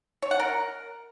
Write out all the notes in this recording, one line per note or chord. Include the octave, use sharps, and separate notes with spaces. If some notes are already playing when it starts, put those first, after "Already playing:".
C#5
F#5
A#4